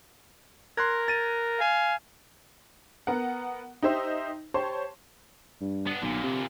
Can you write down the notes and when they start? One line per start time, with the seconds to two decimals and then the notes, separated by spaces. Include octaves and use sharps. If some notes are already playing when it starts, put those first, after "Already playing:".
0.77 A#4 C6 F#6 G#6
1.08 A6 D#7
1.59 F5 G#5
3.07 B3 A#4 F#5
3.82 D#4 G4 C5 E5
4.54 G4 C5 C#5 A5 C6
5.61 G2
5.87 B3 D4
6.02 B1 A#2 D3
6.23 C3